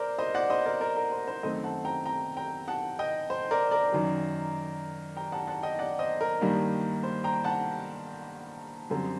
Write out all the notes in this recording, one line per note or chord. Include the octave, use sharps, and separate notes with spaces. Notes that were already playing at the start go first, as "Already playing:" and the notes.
Already playing: A#4 C5 D5
C5 D#5
D5 F#5
C5 D#5
A#4 D5
A#4 D5
A#4
C5
C5
F#2 D#3 A3 C4 C5 D#5
F#5 A5
G5 A#5
G5 A#5
G5 A#5
F#5 A5
D#5 G5
C5
A#4 D5
A#4 D5
F#2 D#3 F#3
G5 A#5
F#5 A5
F#5 A5
D#5 G5
D5 F#5
C5 D#5
A#4
G2 D#3 G3 A#3
C5
G5 A#5
F#5 A5
F#2 D3 G3 C4